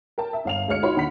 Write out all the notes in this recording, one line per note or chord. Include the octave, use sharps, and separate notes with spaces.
A#4 G5 A5
E5
G1 F5 F7
D2 G#3 C#5 F6 C#7
D#4 F4 F#4 C#5 B5 C6
D#2 D3 F#5 B5 B6